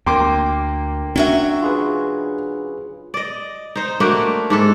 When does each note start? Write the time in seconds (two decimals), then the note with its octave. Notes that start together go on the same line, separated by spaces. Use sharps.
0.06 D2 A#3 G5 C6 D6
1.16 F#3 C#4 D4 F#4 E5
1.62 F4 G#4 B4
3.14 D5 D#5
3.76 D#4 C5
4.00 A3 A#3 D4 F#4
4.50 G#2 D4 A4